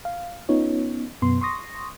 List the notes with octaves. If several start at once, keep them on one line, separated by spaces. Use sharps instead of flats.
F5
B3 C#4 D#4 F4 C#5
F#2 B2 B3 C6
C6 C#6 D#6 A#6